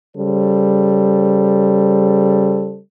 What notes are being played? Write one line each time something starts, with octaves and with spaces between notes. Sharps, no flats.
C#3 G3 A4 C5